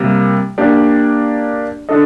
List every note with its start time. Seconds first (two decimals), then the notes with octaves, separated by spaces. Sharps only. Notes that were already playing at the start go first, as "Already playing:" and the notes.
Already playing: C3 G3 A#3
0.58 A#3 D4 G4 D5
1.89 D4 A4 D#5